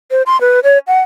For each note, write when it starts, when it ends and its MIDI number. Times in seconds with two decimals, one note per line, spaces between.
0.11 0.22 72
0.26 0.40 84
0.41 0.60 71
0.64 0.78 73
0.87 1.01 78